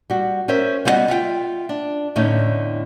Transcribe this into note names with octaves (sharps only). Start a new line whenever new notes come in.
G3 F#4
C#4 A#4 C5 E5
G3 B3 E4 F#4 D#5 F#5
F4 E5 F#5 G5
D4
E2 A2 D3 A3 C#4 D#4